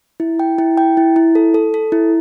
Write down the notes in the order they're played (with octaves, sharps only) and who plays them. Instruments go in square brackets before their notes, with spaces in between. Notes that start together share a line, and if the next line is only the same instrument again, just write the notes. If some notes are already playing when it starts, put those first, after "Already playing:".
[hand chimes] E4
G5
E4
G5
E4
E4
A4
A4
A4
E4